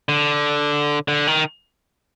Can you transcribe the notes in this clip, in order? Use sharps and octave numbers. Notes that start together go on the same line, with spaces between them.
D3
D3
D#3